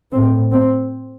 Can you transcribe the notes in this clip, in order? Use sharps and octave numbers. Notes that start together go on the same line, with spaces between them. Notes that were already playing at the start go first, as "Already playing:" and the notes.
A2 C4
C4